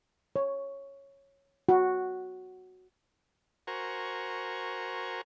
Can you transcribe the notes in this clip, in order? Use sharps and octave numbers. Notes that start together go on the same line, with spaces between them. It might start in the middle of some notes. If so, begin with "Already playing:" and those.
C#5
F#4
F#4 A#4 C5 G#5 A#5 C#6